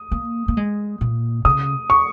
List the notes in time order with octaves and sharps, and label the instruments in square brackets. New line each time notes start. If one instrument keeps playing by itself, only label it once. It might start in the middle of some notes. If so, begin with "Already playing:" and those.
Already playing: [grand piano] D#6
[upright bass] A#3
A#3
G#3
A#2
[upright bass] C#3 [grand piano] D#6
[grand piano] C#6